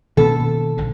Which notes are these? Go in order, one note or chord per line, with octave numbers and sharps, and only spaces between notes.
B2 D#3 A#3 C#4 A4
A#1 G#2 D3